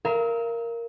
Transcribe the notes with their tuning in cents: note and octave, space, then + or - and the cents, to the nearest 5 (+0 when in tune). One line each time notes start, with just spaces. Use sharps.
A#4 +0 F5 -30 E6 -45